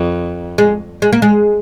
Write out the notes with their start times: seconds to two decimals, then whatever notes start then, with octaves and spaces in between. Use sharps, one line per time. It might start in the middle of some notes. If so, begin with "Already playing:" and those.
Already playing: F2
0.58 G#3
1.02 G#3
1.12 A#3
1.22 G#3